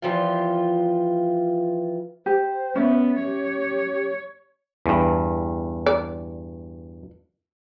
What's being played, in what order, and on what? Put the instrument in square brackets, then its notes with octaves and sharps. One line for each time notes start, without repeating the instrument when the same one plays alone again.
[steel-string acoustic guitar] E2 E3 F3 F4 G4 F5
[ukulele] G4 [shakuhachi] C5
[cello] B3 [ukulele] C#4 E5
[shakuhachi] G4 [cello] C#5
[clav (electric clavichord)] E2 G2
[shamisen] D5